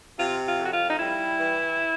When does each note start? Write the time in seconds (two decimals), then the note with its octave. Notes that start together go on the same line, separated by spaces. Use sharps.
0.18 C3 F4
0.46 F4
0.59 F2
0.65 F#4
0.72 F4
0.90 D#4
0.99 G3 E4
1.39 E3